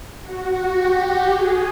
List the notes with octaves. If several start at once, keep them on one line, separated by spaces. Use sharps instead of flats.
F#4
G4
G#4